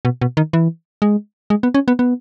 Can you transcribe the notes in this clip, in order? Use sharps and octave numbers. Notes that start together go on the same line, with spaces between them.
B2
B2
D#3
E3
G#3
G#3
B3
C#4
B3
B3